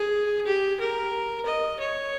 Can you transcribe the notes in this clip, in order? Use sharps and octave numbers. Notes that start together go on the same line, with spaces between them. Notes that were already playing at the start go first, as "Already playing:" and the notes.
Already playing: G#4
G4
A#4
D#5
C#5